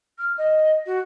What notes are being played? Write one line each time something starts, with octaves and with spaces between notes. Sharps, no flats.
F6
D#5
F#4